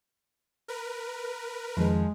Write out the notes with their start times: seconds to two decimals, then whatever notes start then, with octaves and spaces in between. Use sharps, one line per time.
0.68 A#4 B4
1.77 F2 D#3 F3 G#3